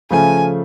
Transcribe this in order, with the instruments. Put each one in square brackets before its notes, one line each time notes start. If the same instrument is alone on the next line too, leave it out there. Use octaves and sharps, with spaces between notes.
[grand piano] C#3 F3 A3 [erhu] G#5